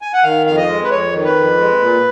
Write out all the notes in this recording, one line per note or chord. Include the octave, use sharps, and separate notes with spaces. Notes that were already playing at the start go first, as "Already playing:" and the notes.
G#5
F#5
D#3 F5
F2 F5
D#5
G#3
B4
F2 C#5
D#3
B4
F2
G#3
A#2